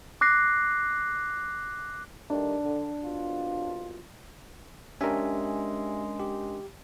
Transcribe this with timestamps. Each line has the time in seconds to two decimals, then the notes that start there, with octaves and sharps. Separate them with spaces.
0.21 D6 F#6 A#6 C7
2.30 D#3 G3 A3 D4
2.65 D3
3.04 C2 B2 F4
5.01 G#3 C#4 D4 G4 A#4 E5 G#5
6.20 G4